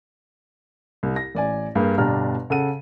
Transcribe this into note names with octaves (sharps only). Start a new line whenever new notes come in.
C2
A#6
A1 D5 G#5
G2 G3 A#3 G#4
G1 B2 D4 G4 A#5 F6
C#3 A4 F#5 D#7